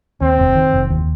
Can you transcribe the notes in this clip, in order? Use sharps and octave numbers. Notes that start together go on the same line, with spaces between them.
D#2 C4
F1
D#3
F1
D#2